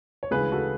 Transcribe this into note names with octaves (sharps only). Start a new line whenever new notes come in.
C#5
D2 C#3 E3 G#3 G#4 B4
F#4 A4